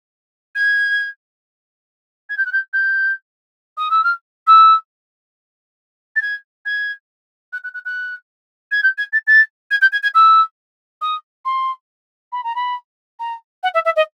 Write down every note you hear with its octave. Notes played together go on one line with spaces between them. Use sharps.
G#6
G#6
G6
F#6
G6
G6
D#6
E6
F6
E6
A6
G#6
G#6
F#6
F#6
F#6
F#6
G#6
G6
G#6
A6
A6
G#6
G6
G#6
G#6
E6
D#6
C6
B5
A#5
B5
A#5
F#5
E5
E5
D#5